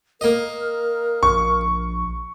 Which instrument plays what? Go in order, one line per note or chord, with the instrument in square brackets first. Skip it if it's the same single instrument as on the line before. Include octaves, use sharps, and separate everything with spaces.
[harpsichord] A#3 D#5 [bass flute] A#4
[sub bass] A#1 [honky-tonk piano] C#6